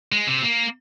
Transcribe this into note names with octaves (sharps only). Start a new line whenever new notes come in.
G#3
C3
A#3